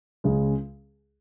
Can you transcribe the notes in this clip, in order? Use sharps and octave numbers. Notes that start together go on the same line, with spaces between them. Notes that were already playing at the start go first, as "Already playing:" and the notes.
C#2 C#3 G#3